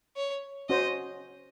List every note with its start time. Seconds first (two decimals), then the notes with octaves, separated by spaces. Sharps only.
0.16 C#5
0.69 C#4 F#4 C5 D#5